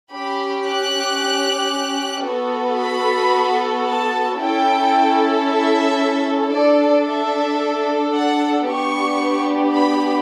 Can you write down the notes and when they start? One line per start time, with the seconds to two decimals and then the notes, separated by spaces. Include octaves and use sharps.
0.13 C#4 G4 B5
0.67 F#6
2.28 B3 F#4 A4
2.81 B5
3.88 A5
4.41 C#4 E4 A4 G5
5.48 E5
6.55 D4 A4 D5
7.08 E5
8.15 F#5
8.69 B3 D4 G4 C#6
9.76 B5